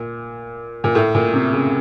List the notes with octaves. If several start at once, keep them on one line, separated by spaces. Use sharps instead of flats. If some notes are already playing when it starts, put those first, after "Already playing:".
Already playing: A#2
A#2
A2
A#2
C3
C#3